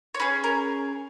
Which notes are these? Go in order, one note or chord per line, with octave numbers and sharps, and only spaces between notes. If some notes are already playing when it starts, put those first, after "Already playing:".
C#5
C#4 G#4 B4
A#4